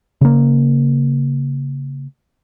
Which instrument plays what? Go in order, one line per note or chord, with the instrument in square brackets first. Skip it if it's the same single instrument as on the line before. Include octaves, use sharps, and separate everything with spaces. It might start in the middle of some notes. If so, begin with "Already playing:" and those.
[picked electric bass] C#3 A#3